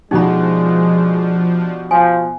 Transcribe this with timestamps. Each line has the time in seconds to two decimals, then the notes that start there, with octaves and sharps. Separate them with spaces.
0.11 B2 F3 G#3 D4 D#4 F#4 G4 B5
1.91 F3 G#5